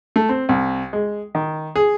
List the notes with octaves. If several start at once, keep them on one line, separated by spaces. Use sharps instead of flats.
A3
C4
C2
G#3
D#3
G#4